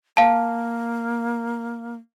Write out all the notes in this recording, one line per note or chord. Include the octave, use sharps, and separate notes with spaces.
A#3 F5 A5